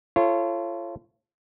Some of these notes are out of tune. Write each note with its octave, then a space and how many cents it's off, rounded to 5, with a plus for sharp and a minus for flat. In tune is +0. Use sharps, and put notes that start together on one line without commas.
F4 -35 A4 +0 C#5 -25